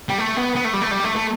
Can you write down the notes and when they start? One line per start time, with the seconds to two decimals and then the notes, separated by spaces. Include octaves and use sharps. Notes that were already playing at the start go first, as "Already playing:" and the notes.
0.09 G3
0.18 A3
0.37 B3
0.55 B3
0.65 A3
0.73 G3
0.82 A3
0.91 G3
1.04 A3
1.16 A3